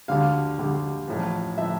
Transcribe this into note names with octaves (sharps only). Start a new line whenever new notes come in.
D2 D3 G3 F5
D2 D3 G3
A1 A2 F3
A2 F3 E5